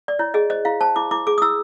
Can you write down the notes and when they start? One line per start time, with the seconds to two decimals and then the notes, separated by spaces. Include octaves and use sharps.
0.08 D5
0.19 E4 C#5
0.34 G#4 D#5
0.50 C5 D#5
0.65 E4 F5
0.81 C5 A5
0.96 E4 D6
1.11 E4 D6
1.27 G#4 D6
1.38 D#6
1.42 E4 E6